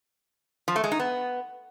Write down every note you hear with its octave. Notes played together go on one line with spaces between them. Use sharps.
F3
A3
G#3
D#4
B3